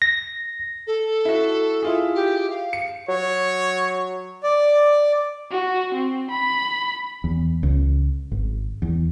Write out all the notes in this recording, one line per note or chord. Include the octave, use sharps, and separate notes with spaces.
A#6
A4
E4 F#4
E4 F4 G#4
G4
F5
C#7
F#3 C#5
D5
F#4
C4
B5
E2
C#2
G#1
E2